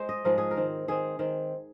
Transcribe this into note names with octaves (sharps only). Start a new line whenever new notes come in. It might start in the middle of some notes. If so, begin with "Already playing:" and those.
Already playing: G#3 C5
D#5
G#2 F3 G#3 C4 A#4
G#4
A#4
D#3 C4
D#3 C4 G#4
D#3 C4